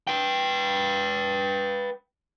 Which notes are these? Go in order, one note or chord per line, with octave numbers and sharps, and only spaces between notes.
B4 G5